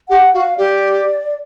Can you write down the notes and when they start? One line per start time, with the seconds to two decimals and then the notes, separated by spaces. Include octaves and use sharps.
0.09 G4 F#5
0.34 F#4 F5
0.58 G4 D5